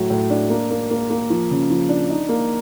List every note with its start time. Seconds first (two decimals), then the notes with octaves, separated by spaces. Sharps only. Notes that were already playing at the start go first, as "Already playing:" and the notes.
Already playing: A2 F#3
0.10 A2
0.30 D4
0.50 A#3
0.71 A#3
0.91 A#3
1.10 A#3
1.30 F3
1.51 C#3
1.70 F3
1.89 D4
2.10 D#4
2.29 A#3